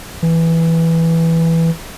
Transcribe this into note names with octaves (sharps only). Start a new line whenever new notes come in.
E3